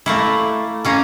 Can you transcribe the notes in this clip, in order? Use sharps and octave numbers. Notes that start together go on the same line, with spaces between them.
A3 A#3 E4
A#3 C#4 A#4